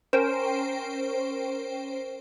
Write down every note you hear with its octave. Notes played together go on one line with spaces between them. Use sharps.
C#4 A#4 C5 G5